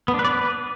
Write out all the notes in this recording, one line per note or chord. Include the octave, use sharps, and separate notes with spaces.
B3
D4
B4
D5
B4